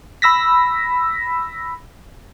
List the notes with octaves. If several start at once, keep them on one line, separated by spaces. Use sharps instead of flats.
B5 E6 A#6 B6